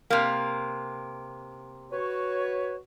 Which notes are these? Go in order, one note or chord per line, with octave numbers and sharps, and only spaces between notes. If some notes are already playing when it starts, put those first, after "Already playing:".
C3 A#3
F#4 B4 C#5